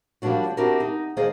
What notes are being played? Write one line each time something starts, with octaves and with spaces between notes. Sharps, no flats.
F3 G3 A#3 C#4 D4 F#4
C4 D4 E4 F#4 G4 A#4
D#4
D#3 A#3 G#4 C5 D5 D#5